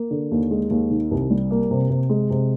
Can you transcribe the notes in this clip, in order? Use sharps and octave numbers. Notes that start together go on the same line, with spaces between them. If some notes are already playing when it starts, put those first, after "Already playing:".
Already playing: A#3
D3
D#2
G#3
D#2
D#3
C2
G3
A#3
C3
C3
G#3
C3